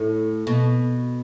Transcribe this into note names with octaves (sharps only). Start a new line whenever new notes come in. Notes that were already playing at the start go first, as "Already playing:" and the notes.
Already playing: A2
B2